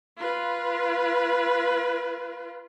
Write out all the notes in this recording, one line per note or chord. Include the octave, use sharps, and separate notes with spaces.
F4 B4